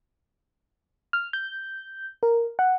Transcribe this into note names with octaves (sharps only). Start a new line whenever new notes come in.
F6
G6
A#4
F#5